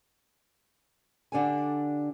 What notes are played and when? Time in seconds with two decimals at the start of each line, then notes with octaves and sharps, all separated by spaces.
1.32 D3 D4 G4 A4 G#5